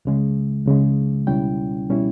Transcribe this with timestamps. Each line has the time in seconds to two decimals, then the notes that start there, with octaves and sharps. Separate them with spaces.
0.05 C#2 C#3 G#3
0.65 C#2 C#3 G#3
1.27 C#2 B2 G3 C#4 E4 G5
1.89 B2 G3 C#4 E4